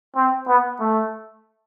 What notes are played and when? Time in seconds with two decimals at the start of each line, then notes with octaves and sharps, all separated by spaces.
0.16 C4
0.47 B3
0.80 A3